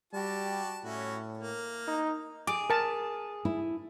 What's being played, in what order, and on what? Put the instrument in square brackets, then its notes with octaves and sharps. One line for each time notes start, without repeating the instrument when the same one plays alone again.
[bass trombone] G3 [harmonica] F#4 G4 A5
[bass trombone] A2 [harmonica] C#4 E4 F#4
[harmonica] A#3
[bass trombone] D#4
[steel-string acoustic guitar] G#4 [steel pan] D6
[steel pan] A#4 A5
[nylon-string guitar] E4